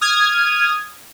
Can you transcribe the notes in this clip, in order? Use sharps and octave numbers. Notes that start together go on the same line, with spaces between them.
D#6 F6 G#6